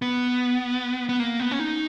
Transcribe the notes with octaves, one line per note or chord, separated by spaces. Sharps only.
B3
B3
A#3
B3
C#4
D#4